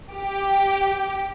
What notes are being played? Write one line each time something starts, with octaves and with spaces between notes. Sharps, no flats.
G4